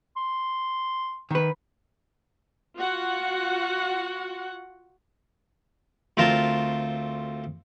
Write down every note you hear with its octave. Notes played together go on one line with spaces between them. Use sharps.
C6
D#3 B4
F4 F#4 F#5
D2 C4 F4 A#4 A5 C6